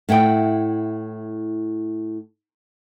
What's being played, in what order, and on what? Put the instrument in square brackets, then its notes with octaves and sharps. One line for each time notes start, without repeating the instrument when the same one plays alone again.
[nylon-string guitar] A2 E4 F#5 G5